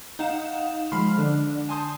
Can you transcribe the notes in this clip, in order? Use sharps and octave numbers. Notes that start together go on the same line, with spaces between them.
D#4 F5 F#5 E7
F3 G#3 B5 C6 F6 C7
D3 D4
G#5 A5 C6 D#6 G6